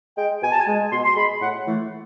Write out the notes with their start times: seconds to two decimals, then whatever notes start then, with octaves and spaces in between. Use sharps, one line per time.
0.18 G#3 G5
0.43 B2 G#5
0.52 A5
0.60 G#5
0.68 G#3
0.92 B2 C6
1.05 C6
1.16 G#3 B5
1.41 A2 F#5
1.67 E3 A3